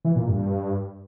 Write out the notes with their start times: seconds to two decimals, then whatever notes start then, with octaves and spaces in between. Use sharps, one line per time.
0.05 E3
0.16 A#2
0.27 G2